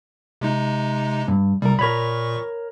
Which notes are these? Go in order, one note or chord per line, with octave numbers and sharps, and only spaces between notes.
C3 G#3 D#4
G2
C2 G3 A#4
A#2 A#4 C#5 B5 C#6